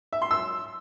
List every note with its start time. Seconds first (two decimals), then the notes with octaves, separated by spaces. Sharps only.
0.13 E5
0.22 C6
0.31 E6